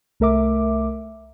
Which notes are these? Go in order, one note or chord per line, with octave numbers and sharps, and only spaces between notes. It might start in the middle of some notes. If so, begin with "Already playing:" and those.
C2 A3 A#4 E5 D6